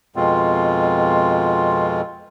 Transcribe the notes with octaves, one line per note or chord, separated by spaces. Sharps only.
F2 B2 G#3 C4 F4